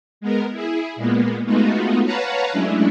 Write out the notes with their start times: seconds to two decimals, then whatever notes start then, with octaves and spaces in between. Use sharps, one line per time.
0.21 G#3 B3 A#4
0.52 E4 G#4
0.96 A#2 G#3 A#3 B3
1.46 G#3 A3 B3 D#4 F4 F#4
2.05 B4 C#5 F5 F#5 A5 A#5
2.52 F#3 G#3 A3 C#4 D4 E4